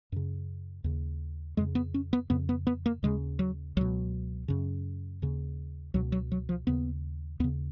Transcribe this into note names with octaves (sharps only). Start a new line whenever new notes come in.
F#2 C#3
D#2 C#3
F2 C#3 G#3
B3
C#4
B3
F2 C#3 B3
B3
B3
A#3
D#2 C#3 G#3
F#3
C#2 B2 F#3
F#2 C#3
D#2 C#3
C#2 B2 F#3
F#3
F#3
F3
D#2 C#3 B3
D#2 C#3 B3